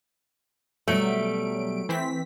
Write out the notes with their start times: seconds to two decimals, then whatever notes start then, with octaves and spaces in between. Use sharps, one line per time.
0.88 B2 F#3 G3 A3 E5 D7
1.89 E3 C4 B6